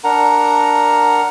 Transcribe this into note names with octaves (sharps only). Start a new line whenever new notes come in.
D4 A#4 F#5 A#5